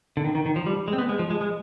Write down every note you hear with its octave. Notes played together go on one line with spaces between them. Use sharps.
D3
D#3
D#3
D#3
F3
G3
G#3
C4
B3
G#3
F3
G#3
G#3